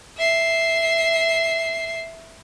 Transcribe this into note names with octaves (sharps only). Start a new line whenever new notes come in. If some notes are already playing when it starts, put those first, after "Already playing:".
E5 C7